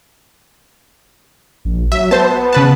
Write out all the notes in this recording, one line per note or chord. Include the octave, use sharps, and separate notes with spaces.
A#1
F#3 E5
B3 C5 A5
C#3 B4 A5